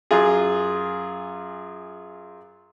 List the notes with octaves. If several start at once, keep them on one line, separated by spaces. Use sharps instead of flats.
F#2 F4 G#4